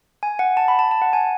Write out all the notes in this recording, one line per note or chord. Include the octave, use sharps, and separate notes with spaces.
G#5
F#5
A5
B5
A5
A5
F#5
G#5